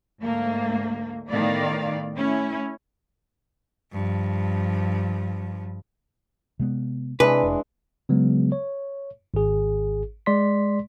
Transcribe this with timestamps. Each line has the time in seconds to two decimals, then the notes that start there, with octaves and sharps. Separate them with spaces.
0.21 D2 G#2 A3 A#3
1.30 A2 D#3 B3 D5 F5
2.14 A3 C#4 E4
3.92 G2 F3
6.59 C3 G#3 B3
7.20 C3 E3 G#3 D4 B4
7.43 F1
8.09 C#3 F#3 G#3 B3
8.52 C#5
9.34 G#1 G#4
10.26 G#3 D5 C6 B6